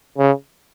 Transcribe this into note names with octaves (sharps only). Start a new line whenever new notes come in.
C#3